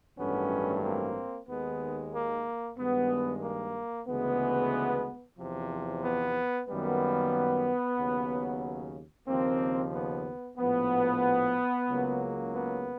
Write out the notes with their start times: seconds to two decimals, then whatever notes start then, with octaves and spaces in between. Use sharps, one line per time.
0.18 A1 G2 D#3 F#3 A3 B3 C#4
0.83 A#3 C4
1.48 D#2 D#3 G#3 B3
2.13 A#3
2.78 G2 D#3 G#3 B3
3.43 A#3
4.08 D2 C#3 E3 G#3 B3
5.38 E2 C3 F3
6.03 B3
6.68 F#2 D#3 G3 A#3 B3
7.98 D#2 C#3 F#3
9.28 D#2 C#3 F3 A#3 C4
9.93 B3
10.58 A#1 A2 F3 B3
11.88 C#2 C#3 F#3 A#3
12.53 B3